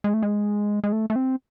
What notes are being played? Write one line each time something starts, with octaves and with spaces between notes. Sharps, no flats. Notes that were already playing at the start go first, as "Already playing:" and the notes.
G#3
A3
G#3
G#3
A3
A3
C4